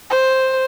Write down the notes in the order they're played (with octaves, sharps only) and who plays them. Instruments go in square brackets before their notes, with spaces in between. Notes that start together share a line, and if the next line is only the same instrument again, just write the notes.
[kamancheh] C5